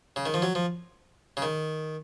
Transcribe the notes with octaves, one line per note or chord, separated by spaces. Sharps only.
C#3
D#3
F3
F#3
F3
C#3
D#3